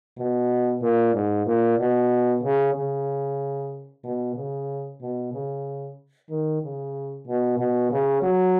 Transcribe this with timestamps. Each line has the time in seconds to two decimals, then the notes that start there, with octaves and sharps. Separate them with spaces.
0.17 B2
0.81 A#2
1.13 G#2
1.46 A#2
1.78 B2
2.43 C#3
2.74 C#3
4.03 B2
4.36 C#3
5.01 B2
5.33 C#3
6.29 D#3
6.62 C#3
7.26 B2
7.58 B2
7.91 C#3
8.22 F#3